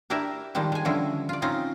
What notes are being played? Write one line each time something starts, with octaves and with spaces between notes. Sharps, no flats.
D4 E4 G4 A#4 D5 E5
D#3 F3 G3 G#3 G4
G#3 G#5
D3 E3 F3 G3 C#4 E4
F4 D5
C4 C#4 D#4 F4